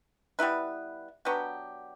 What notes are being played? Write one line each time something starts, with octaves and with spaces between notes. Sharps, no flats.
G3 B3 E4 B4
F#3 B3 D4 G4